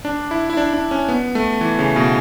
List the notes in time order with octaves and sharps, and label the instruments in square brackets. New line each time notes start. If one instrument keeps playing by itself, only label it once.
[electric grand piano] D4
E4
E4
D4
D4
C#4
B3
A3
E3
C#3
B2